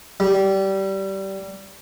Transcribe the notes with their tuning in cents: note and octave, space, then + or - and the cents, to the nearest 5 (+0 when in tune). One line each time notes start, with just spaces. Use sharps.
G3 -20